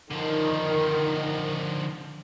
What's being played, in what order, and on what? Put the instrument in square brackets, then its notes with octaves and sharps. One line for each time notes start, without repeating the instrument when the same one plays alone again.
[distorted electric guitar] D3 F3 [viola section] D#3